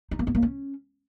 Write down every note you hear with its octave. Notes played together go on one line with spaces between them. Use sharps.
D#4
A#3
B3
A#3
C#4